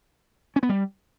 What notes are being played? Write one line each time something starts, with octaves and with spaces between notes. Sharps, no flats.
C#4
B3
G3